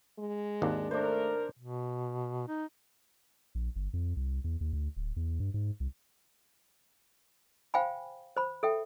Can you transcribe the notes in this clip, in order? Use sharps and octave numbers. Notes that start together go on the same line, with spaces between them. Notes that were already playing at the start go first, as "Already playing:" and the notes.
G#3
G#1 D#2 D4
A3 D4 A#4 C5
B2
D#4
A#1
G1
F2
C2
E2
D#2
D2
D1
E2
G2
G#2
C2
C5 F5 G5 G#5 B5
C5 B5
A4 E5 G5